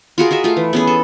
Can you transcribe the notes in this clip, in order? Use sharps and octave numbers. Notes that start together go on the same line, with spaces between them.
F4 F#4 G#4 A#4
F#4 G#4 D#5 E5
A3 F4
E3
B3 C#4 G#4
A4